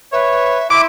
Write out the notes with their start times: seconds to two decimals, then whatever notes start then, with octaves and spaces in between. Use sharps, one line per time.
0.12 B4 C#5 E5
0.70 E4 E5 C6 D6